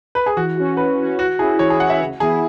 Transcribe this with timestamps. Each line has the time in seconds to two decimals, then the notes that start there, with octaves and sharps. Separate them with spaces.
0.15 B4
0.26 G#4
0.37 E3 F#4
0.57 C#4 F#4
0.77 E3 B4
0.97 C#4 F#4
1.18 E3 F#4
1.39 E4 G#4
1.42 C#4
1.59 E3 C#5
1.70 G#4
1.80 C#4 F#5
1.84 E4
1.90 E5
2.00 C#3
2.20 E3 B3 E4 G#4